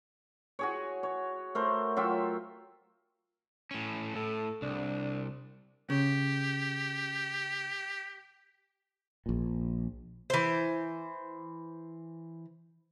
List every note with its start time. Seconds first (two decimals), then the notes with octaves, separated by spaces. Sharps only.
0.59 F#4 G#4 C#5
1.03 C#5
1.55 A3 A#4 C5
1.97 F#3 F4 E5 G5
3.71 A2 C#4
4.15 A2 A4
4.62 C2 D4
5.90 C#3 G4
9.26 A#1 A#2
10.30 E3 C5